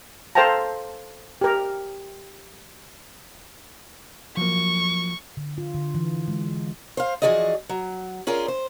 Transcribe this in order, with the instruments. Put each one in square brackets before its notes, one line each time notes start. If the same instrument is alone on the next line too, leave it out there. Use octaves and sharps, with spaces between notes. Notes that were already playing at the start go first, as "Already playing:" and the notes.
[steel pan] A4 C5 F5 G5 A5 A#5
G4 A#4
[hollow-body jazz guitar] F3 F#3 A#3 [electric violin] C#6
[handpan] D3
F4
D3
E3
G#3
[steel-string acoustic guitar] C5 F5
E3 F3 F#4 G#4 D5 D#5
F#3
C#4 F4 G#4 A#4 D5
C5